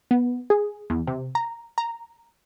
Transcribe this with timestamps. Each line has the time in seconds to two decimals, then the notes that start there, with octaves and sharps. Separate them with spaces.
0.11 B3
0.50 G#4
0.90 E2
1.07 C3
1.35 A#5
1.78 A#5